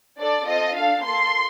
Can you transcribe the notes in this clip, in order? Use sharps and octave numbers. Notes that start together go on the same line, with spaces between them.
D4 A4 D5
C4 F4 A4 D#5
D4 A4 F5
A#3 F4 A4 C6